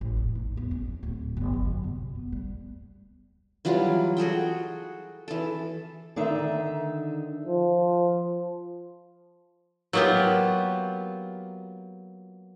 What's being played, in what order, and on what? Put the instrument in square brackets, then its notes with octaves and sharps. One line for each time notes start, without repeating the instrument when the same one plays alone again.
[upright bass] A1
F1
D#4
E2
C#4
D1
G1
F#3
F#2
C3
B3
G3
[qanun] E3 F#3 G3 F4
F#4 G#4 A4 G5
E3 A4
[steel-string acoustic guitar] D3 D#3 D#4 E5
[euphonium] F3
[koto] F#3 A#3 B3 F4 G4